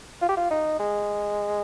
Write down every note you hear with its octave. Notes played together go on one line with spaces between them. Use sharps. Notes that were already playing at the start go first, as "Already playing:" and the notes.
F4
G4
F4
D#4
G#3